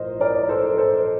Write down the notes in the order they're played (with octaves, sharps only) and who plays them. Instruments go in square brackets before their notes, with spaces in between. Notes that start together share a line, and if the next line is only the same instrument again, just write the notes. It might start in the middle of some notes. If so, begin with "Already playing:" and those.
Already playing: [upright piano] A#1 A2 A#4 C5 D#5
A#4 D5
A4 C5
A4 C5